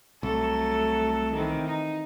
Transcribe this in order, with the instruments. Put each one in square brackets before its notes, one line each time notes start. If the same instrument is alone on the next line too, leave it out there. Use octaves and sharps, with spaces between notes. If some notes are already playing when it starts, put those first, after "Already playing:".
[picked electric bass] C2 [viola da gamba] F#3 A3 A4
[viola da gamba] D#3 E3 C4
D#4